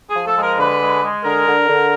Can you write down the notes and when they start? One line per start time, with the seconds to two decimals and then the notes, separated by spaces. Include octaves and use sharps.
0.10 F3 G#4
0.27 A4
0.37 G#3
0.43 A#4
0.59 D3 B4
0.81 G#3
1.03 G#3
1.24 D3 A#4
1.47 D3
1.69 D3